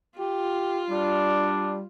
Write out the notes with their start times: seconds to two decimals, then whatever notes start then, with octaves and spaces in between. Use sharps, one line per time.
0.19 F4 G4
0.90 G3 D4